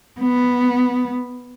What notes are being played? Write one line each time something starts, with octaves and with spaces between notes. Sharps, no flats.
B3